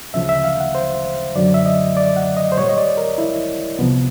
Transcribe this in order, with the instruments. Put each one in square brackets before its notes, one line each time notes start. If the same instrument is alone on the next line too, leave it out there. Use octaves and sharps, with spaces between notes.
[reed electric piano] D2 C#3 F3 E5
E5
F5
F#5
C5
F#2 D3 F#3 D5
E5
D#5
D5
F#5
D#5
C5
A#2 G3 C#5
D#5
D5
A#4
E4
C2 C3 F3 B3